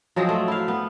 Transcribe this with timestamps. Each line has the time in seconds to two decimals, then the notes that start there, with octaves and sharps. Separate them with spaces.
0.16 F3 F#3 G#3 C4
0.29 A3
0.48 E4 F5
0.68 B3